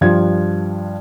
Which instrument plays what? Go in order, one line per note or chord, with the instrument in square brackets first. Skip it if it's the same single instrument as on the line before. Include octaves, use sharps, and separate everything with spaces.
[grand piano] G2 F3 G#6